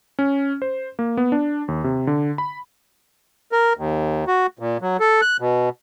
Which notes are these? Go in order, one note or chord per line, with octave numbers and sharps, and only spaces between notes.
C#4
C5
A#3
B3
D4
D#2
C3
D3
B5
A#4
D#2
F#4
A#2
F#3
A4
F#6
B2